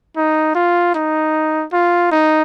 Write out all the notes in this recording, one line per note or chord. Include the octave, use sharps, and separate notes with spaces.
D#4
F4
D#4
F4
D#4